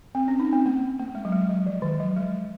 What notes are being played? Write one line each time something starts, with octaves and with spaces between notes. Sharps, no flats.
C4
C#4
D#4
C4
A#3
A#3
G#3
F#3
G#3
F#3
F3
D#3
F#3
G#3